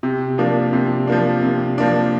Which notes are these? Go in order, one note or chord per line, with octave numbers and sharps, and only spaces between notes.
C3
F3 A#3 D4
C3
F3 A#3 D4
C3
F3 A#3 D4